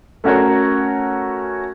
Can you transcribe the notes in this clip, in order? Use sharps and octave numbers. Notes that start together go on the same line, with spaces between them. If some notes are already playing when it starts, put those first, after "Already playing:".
A3 C#4 F#4 A#4 C#5